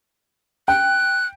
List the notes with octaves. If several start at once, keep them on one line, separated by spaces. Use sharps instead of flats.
G5 F#6